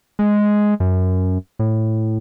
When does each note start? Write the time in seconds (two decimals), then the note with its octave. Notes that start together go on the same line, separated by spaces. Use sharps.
0.19 G#3
0.80 F#2
1.59 A2